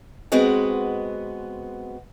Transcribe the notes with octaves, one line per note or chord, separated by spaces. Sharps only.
G#3 B3 C4 F#4 D#5